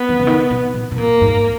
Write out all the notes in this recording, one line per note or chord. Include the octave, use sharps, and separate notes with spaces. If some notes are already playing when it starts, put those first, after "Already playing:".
Already playing: B3
D#3
C#3
D#3
B2
A#2
B2
A#2 A#3
G#2